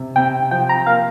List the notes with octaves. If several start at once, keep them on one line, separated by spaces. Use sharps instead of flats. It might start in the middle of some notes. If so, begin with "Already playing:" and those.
Already playing: C3
C3 G5
F3 G5
A#5
A#3 F5